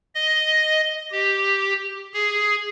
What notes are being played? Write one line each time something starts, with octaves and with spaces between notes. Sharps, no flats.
D#5
G4
G#4